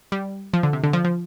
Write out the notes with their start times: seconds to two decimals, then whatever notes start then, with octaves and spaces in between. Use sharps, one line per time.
0.12 G3
0.54 F3
0.63 D3
0.73 C3
0.84 D3
0.93 F3
1.05 F3